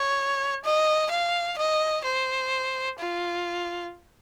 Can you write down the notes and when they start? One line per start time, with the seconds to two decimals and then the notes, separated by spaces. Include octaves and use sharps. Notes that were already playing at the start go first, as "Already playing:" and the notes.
Already playing: C#5
0.64 D#5
1.11 F5
1.58 D#5
2.04 C5
2.99 F4